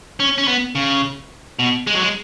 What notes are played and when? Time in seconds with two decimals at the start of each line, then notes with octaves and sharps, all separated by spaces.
0.20 C#4
0.38 C#4
0.48 B3
0.75 C#3
1.59 B2
1.87 G#3
1.94 F#3
2.02 G#3